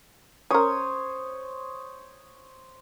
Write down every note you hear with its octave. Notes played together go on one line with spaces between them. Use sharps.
C#4 A#4 C5 C#5 D#6